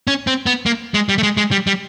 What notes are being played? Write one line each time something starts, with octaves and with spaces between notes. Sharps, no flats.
C#4
C4
B3
A#3
G#3
G3
A3
G#3
G#3
G3
G3